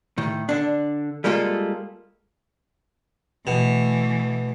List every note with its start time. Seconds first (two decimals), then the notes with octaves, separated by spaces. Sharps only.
0.18 A2 D#3
0.49 D3 D4
1.24 G3 G#3 A#3 F4 A4
3.47 B2 E3 A3